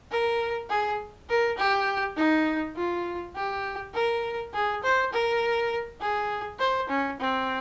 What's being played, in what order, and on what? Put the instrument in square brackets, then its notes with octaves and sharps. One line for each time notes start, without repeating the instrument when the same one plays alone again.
[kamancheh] A#4
G#4
A#4
G4
D#4
F4
G4
A#4
G#4
C5
A#4
G#4
C5
C#4
C4